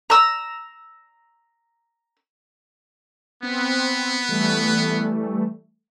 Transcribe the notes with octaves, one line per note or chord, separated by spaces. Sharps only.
A#5 E6
B3 C4
E3 G3 A3